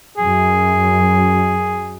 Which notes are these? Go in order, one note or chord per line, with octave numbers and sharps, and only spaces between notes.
F#2 G#4